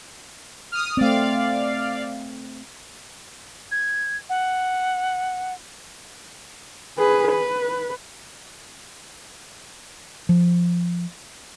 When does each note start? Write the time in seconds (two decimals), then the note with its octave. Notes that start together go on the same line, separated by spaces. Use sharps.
0.71 D#6 F6
0.97 A3 C4 D5 F5
3.71 G#6
4.29 F#5
6.98 G#4 B4
7.31 B4
10.29 F3